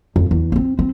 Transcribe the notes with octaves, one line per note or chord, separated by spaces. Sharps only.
F2
E2
A#3 C4
C4